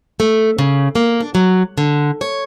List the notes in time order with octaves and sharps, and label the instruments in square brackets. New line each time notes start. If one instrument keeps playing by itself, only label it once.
[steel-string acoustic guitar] A3
C#3
A#3
D4
F#3
D3
C#5